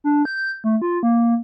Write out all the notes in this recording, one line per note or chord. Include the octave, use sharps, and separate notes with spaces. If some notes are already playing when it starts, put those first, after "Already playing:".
D4
G6
A3
F4
A#3